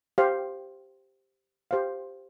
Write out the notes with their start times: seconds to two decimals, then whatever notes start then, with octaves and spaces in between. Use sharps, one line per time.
0.18 G4 C5 F5
1.71 G4 C5 F5